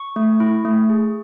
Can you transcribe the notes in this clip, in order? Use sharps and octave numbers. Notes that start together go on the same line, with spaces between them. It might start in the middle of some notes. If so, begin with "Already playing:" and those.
Already playing: C#6
A3
E4
A3
G#4